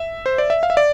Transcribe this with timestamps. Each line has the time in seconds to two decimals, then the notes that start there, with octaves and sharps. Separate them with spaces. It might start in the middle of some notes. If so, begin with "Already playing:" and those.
Already playing: E5
0.26 C5
0.38 D5
0.50 E5
0.63 F5
0.70 E5
0.77 D5